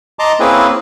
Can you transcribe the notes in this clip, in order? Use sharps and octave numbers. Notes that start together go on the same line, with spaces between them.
D#5 A5 A#5 C6 D6
A#3 C4 C#4 E4 G#4 B4